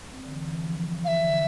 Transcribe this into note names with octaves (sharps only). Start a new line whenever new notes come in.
C4
D3
E3
E3
F3
E3
E3 E5 F5
D3